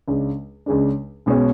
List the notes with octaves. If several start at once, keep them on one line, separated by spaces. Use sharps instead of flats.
C#2 C#3 G#3 D4
C#2 C#3 G#3 D4
B1 B2 G#3 C#4